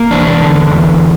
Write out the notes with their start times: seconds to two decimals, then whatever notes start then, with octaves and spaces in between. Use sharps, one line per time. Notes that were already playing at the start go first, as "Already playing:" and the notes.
Already playing: A#3
0.11 E2 D4
0.42 D3
0.71 E2